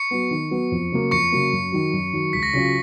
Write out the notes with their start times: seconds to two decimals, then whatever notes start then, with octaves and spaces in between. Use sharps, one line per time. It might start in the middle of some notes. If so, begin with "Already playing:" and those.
Already playing: C#6 C#7
0.11 F#3 B3
0.31 D#3
0.51 F#3 B3
0.72 F2
0.92 C#3 F#3 A#3
1.11 F2 C#6 C#7
1.32 C#3 F#3 A#3
1.53 F#2
1.72 D#3 F#3
1.93 F#2
2.13 D#3 F#3
2.33 C#2 B6
2.43 A#6
2.53 C#3 F#3 C#4 F4 B6